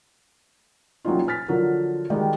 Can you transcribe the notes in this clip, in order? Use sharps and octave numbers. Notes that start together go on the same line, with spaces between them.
F#3 G3 A#3 C#4 D#4 F4
G#5 F6 A6 B6
D3 F3 F#3 A#4
D#3 G3 G#3 D#4 F#4